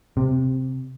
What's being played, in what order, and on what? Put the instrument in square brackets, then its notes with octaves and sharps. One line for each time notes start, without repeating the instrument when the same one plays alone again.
[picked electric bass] C3